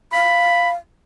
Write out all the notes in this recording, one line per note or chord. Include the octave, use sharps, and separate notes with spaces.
F5 B5